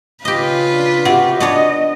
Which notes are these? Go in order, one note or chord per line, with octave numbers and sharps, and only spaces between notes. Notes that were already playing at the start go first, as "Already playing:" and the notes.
C#3 F4 G4 B4 D#5
D4
C3 F#4 G4 F#5
B3 D4 C#5 D#5